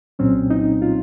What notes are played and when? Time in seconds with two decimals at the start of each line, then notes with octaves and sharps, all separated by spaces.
0.19 C2 A#2 F#3 C4 C#4
0.50 D#4
0.82 F4